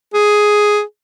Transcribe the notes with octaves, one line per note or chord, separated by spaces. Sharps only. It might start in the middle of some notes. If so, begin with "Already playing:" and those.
G#4